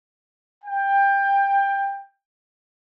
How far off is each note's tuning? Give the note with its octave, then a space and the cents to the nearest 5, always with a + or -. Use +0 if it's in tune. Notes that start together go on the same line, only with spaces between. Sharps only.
G5 +20